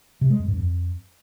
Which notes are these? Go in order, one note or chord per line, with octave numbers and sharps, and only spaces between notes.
C3
G#3
F2
G2
F2